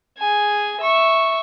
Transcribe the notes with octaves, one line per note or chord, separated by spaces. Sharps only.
G#4 G#5
E5 C#6